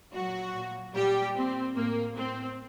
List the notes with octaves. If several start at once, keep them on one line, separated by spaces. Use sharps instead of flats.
A#2 F#3 F#4
A#2
A#2 G3 G4
A#2 C4
A2 A#3
A2 C4